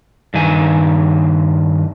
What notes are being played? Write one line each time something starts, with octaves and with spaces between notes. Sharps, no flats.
G2 D#3 G#5